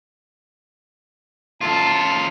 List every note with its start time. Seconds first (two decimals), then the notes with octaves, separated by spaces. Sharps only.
1.61 F#2 F4 A5